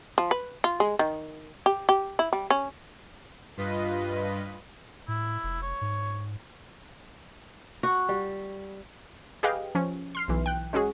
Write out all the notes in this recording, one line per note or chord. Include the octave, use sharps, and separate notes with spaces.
F3
B4
F4
G#3
D#3
G4
G4
E4
G3
C#4
G2 F4 B4 D#5 B6
A2 E4
F1
C#5
G#2
F#4
G3
G4 G#4 B4 D#5 F5 G5
F3 C#4
C6 F6 C7
B1 E3
G5 F#6
G#3 C#4 F#4 G#4